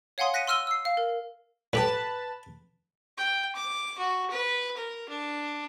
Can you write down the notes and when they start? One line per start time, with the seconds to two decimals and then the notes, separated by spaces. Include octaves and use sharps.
0.18 C#5 F5 F#5 G#5 C6 D#6
0.34 F#6 A#6 B6 C#7 D#7
0.48 C6 E6 F6 D#7 G7
0.67 E6 C7
0.85 F5
0.97 A#4
1.73 A2 G4 B4 G5 A5
3.17 G5
3.55 D6
3.98 F#4
4.30 B4
4.76 A#4
5.09 D4